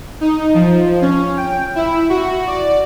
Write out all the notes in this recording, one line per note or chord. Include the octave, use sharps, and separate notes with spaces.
D#4
F3
C#4
G5
E4
F#4
D5